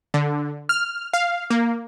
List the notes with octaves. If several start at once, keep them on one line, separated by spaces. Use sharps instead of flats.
D3
F6
F5
A#3